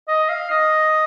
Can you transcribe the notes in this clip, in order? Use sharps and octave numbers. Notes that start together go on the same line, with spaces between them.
D#5
F5
D#5